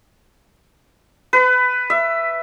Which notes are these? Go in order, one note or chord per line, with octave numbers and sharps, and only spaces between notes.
B4
E5